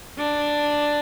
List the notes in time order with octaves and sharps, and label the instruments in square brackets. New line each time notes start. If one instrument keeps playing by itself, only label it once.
[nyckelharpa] D4